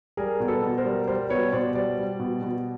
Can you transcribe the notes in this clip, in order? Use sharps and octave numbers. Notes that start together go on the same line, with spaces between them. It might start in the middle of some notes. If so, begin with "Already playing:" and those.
G3 G#4 A#4
B2
A4 B4
B2
A#4 C5
G3
G3 A#4 C5
B2 B4 C#5
B2 C5 D5
G3 C5 D5
G3
B2
B2